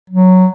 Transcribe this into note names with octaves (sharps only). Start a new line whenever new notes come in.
F#3